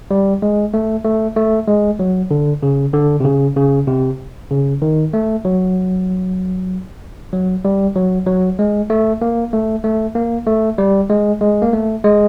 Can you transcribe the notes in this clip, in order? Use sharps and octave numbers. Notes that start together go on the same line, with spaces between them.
G3
G#3
A3
A3
A3
G#3
F#3
D3
C#3
D3
C3
C#3
C#3
C3
C#3
D#3
A3
F#3
F#3
G3
F#3
F#3
G#3
A3
A#3
A3
A3
A#3
A3
G3
G#3
G#3
A#3
A3
G#3